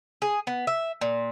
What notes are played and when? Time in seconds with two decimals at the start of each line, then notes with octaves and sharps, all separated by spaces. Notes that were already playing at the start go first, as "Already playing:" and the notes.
0.22 G#4
0.47 B3
0.67 E5
1.01 A#2